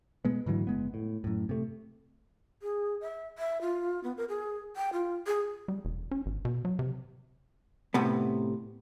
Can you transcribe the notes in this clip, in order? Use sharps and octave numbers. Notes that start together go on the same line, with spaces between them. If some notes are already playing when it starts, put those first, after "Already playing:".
B2 G#3 B3
G#2 D3 E3 F#3
F#1 G#3 B3
A2
F#2 A2
C3 A3
G#4
E5
E5
F4
B3
A#4
G#4
G5
F4
G#4
G3
E1
C#4
G#1
B2
F#3
C3
A2 C3 B3